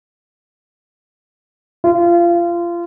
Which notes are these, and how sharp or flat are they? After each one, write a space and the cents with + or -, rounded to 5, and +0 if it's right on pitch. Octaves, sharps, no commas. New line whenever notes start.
F4 -25